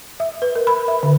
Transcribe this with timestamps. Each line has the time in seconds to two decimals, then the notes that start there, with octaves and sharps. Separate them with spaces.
0.20 E5
0.42 B4
0.56 A#4
0.67 B5
0.88 E5
1.03 D3